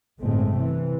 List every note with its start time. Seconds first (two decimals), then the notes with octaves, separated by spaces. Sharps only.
0.21 G1 A2 G#3 A3 C4
0.55 C3 E3